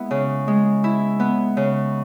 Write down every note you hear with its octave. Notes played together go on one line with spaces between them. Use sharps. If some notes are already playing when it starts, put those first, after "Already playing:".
Already playing: G#3 B3 E4
C#3
G#3
E4
B3
C#3